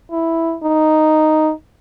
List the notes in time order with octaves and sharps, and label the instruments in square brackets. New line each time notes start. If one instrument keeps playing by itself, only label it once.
[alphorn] E4
D#4